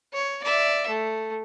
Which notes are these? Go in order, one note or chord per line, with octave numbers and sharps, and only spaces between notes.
C#5
D5 E5
A3